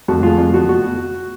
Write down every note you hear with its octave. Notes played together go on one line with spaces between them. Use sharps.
F2 F#4
G#3 F4
F2
B3 F#4
B3 F#4